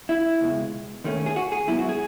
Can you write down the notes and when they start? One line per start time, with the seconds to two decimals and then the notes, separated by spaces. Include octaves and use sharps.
0.09 E4
0.41 C#2 B2 G#3
1.04 D#2 D#3 A3 C#4
1.26 G#4
1.36 F#4
1.52 G#4
1.67 G#2 F#3 B3 E4
1.79 F#4
1.89 G#4